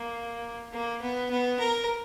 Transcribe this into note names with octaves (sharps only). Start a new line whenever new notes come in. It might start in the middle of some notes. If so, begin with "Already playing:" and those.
Already playing: A#3
A#3
B3
B3
A#4